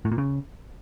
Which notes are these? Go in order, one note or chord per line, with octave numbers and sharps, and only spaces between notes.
A2
A#2
C#3